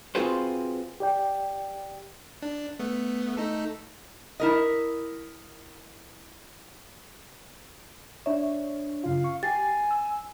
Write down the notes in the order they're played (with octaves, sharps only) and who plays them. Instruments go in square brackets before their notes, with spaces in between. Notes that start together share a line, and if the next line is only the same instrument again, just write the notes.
[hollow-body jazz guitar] C4 F4 F#4 G#4 B4 C5
[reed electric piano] G4 D5 G5
[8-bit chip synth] D4
A3 B3
A3 D#4 A4
[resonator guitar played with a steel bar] E4 A#4 D#5
[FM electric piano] D4 C#5 [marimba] E5
[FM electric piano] F#2 C#3 F4 [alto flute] F5
[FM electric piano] C#6
[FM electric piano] G4 C7 [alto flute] G#5 [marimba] A6
[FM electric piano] E6